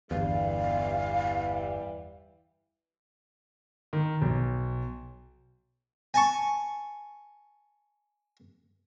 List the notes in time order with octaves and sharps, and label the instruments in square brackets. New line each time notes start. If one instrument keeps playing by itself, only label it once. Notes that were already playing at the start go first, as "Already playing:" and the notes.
[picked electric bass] G1 E2 [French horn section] E3 G3 [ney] F5
[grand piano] D#3
B1
[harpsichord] G#5 A5 C#6